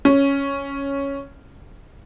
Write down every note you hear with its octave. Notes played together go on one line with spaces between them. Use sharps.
C#4